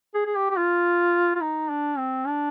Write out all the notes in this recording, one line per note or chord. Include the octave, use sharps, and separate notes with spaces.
G#4
G#4
G4
G4
F4
F4
D#4
D4
C4
D4